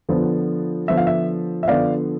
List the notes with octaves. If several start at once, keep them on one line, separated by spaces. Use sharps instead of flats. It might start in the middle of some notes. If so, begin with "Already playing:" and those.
D3 F3 B3
D3 F3 B3 E5
F5
E5
E5
D3 F3 B3 D5 F5